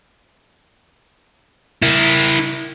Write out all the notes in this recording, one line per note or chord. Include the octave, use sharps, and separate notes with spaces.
E4 A#4